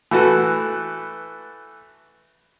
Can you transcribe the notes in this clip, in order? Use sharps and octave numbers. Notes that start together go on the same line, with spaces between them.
E3 A3 F#4 A4 B4